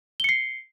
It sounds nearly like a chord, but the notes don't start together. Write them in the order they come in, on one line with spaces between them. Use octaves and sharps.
G7 C#7 C7